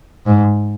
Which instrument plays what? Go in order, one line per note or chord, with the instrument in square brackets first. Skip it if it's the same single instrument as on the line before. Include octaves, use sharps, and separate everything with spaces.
[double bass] G#2